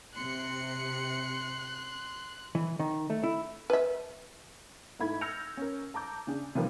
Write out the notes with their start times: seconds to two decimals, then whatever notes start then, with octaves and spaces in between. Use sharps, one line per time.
0.15 C3 C6 F#6 C#7
2.55 E3
2.79 D#3
3.10 A3
3.24 E4
3.70 B4 E5
4.99 G#2 A3 E4 B5 G#6
5.21 E6 F6 G6 A#6 C#7 F7
5.57 C#4 A#4
5.94 A5 A#5 D6 G6
6.27 C#3 D4 G#4
6.55 C3 D#3 F3 G3 A#3 B3